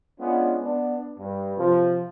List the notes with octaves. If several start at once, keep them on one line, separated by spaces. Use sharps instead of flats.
G#3 B3 C#4 D4 F4
B3 D4
G2
C3 F3